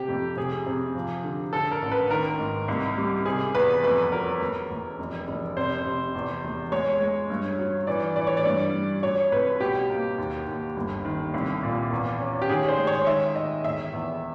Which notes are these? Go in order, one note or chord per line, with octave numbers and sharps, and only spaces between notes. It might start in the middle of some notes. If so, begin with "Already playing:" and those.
Already playing: C3 G4
F2
C3 G#4
C3
F3
D3
D3 A4
A#4
A1
B4
D#3 A#4
G#2
C2
G3
C3 G#4
E2 B4
F2 B4
F#3 A#4
E1
E1
F1
F1
C3 C5
C3
E2
E1
G#3 C#5
G#3
G2
F#3
E3 D5
E3 D5
C#5
D5
G2
G3
F#3 C#5
C2 B4
B2 G4
A#3
D#2
D#2
G1
D#3
C2
A#2
E2
C#4
G4
D#3 G#4
C5
G#3
C#5
D#3 E5
D#3 D#5
E1 E5
E2